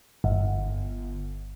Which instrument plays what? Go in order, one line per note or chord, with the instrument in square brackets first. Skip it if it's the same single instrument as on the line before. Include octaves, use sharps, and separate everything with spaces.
[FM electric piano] G1